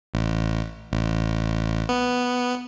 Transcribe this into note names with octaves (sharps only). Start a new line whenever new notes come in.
A1
A1
B3